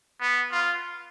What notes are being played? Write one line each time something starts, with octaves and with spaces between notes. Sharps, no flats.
B3
F4